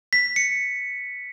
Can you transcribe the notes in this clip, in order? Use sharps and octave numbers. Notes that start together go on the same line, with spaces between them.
B6
C#7